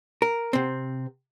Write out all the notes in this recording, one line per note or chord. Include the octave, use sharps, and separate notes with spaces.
A#4
C3 C4